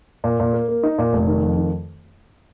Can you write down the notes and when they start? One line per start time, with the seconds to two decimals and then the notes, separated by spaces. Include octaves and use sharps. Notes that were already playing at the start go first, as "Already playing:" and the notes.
0.24 A#2
0.40 A#2
0.53 A#3
0.68 A#3
0.83 D#4
0.98 A#2
1.13 F1
1.27 D#3
1.43 F2
1.57 D#3